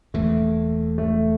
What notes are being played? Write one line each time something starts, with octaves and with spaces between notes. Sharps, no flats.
E1 E2 E3 A3 A#3
A3